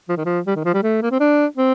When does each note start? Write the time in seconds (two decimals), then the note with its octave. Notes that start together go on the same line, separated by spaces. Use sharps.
0.09 F3
0.17 D#3
0.25 F3
0.46 G3
0.56 D#3
0.65 F3
0.74 G3
0.83 A3
1.02 A#3
1.11 C4
1.20 D4
1.57 C4